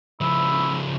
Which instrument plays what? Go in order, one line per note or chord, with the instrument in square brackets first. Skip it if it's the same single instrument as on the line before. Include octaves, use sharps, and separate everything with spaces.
[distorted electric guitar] C#3 F3 [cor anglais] E4